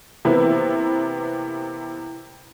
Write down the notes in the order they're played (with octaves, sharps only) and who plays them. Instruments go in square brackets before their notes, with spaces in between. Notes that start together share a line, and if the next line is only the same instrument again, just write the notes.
[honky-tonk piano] C3 E3 A#3 B3 E4